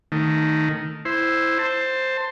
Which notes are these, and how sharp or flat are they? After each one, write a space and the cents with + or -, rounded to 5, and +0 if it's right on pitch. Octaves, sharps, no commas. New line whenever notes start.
D#3 +0 A3 +10
E4 +0 C5 +0
C5 +0 A5 +20